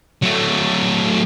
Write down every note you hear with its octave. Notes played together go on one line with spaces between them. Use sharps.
F#3 A3